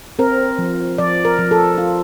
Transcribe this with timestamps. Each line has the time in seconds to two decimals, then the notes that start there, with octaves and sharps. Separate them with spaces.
0.19 C4 A#4
0.59 F3
0.98 F3 D5
1.25 A#4
1.39 F3
1.51 A4
1.78 F4